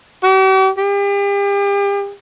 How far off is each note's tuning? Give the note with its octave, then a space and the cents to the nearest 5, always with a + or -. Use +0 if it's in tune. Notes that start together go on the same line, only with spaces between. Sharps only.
G4 -45
G4 +40